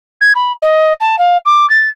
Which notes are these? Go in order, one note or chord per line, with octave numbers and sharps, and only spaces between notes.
G#6
B5
D#5
A5
F5
D6
A6